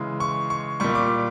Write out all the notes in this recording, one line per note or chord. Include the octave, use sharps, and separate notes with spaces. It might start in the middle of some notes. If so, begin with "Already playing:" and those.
Already playing: C#3 E3 G#3
C#6
C#6
A#2 G3 C#6
D6